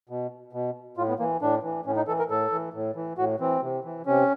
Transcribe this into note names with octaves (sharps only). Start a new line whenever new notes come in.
B2
B2
A2 F4
B3
E3 A#3
A2 D4
E3
A2 C#4
D#4
E3 A4
A#4
A2 A4
E3
A2
E3
A2 F#4
E3 C4
C3
E3
C3 C#4